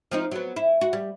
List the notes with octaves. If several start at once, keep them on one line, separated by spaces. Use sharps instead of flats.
F3 C4 D#4
F#3 B3
E4
F#4
G3